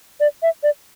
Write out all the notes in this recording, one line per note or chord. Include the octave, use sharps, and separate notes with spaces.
D5
E5
D5